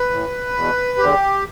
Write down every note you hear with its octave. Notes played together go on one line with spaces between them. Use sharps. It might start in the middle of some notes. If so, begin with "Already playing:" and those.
Already playing: B4
A2 E3
E2 B2
E2 D3 G4